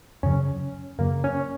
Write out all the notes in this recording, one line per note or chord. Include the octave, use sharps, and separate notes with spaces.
F#2 C#3 F#3 C#4
F#2 C#3 F#3 A#3
C#4